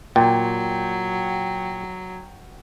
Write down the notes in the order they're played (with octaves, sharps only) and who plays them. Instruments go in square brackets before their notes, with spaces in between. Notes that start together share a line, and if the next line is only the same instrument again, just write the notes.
[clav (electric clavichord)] A#2 [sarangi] F#3 [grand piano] G5